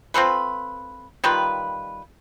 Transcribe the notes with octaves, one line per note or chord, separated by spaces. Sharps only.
C4 F4 A4 B4
D#3 G3 F4 B4